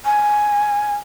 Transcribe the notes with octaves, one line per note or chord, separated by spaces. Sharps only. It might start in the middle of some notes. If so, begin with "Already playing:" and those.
G#5